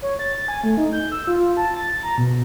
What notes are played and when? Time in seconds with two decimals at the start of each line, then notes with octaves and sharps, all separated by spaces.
0.02 C#5
0.19 A6
0.48 G#5
0.64 A3
0.77 D#4
0.93 G6
1.12 E6
1.27 F4
1.57 A5
1.75 A6
2.03 A#5
2.18 B2